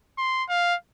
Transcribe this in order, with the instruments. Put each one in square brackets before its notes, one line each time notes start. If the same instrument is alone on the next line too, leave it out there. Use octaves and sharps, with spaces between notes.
[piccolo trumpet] C6
F5